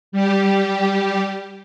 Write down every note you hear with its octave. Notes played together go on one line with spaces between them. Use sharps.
G3 G4